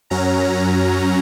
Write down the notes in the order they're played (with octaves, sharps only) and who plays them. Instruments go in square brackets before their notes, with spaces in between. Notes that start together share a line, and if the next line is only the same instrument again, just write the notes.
[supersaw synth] F#2 F#3 C#4 A#5